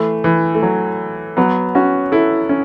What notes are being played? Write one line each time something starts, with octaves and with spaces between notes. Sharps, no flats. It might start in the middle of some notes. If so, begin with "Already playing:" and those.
Already playing: E3 A3
E3
A3
F#3
F#3 B3
C#4 F#4
E4 A4
C#4